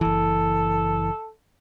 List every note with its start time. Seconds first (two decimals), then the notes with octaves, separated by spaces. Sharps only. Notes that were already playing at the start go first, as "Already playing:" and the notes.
0.01 F#1 E3 A4